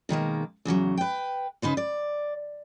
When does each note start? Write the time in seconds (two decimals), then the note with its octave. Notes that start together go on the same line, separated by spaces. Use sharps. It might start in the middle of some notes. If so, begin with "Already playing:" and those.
0.09 B2 D#3 G#3 A#3
0.65 E2 C#3 E3 F#3
0.98 B4 G5
1.62 C#3 D#4 B4 C5
1.77 D5